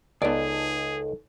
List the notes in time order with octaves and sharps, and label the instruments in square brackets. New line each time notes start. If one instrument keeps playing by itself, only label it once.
[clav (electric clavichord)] C#2 [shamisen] B3 D5 [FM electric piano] D#4 A4 [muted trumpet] G#4